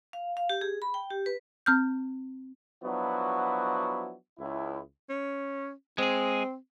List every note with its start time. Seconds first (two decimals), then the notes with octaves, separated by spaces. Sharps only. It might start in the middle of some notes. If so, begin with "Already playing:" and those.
0.13 F5
0.37 F5
0.49 G4
0.61 G#4
0.82 B5
0.94 G5
1.10 G4
1.26 B4
1.66 C4 F6 G6
2.84 F3 F#3 B3 D4 E4 F#4
4.40 C#2 E4
5.09 C#4
5.98 G#3 C4 G#4